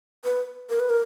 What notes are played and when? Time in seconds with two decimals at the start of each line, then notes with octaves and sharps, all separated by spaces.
0.24 B4
0.70 A#4
0.80 B4
0.90 A#4